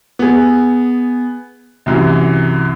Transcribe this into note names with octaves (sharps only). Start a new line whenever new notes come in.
B3 G#4
C2 F#2 E3